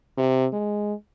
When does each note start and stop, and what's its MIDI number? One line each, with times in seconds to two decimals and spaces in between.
0.17 0.47 48
0.53 0.94 56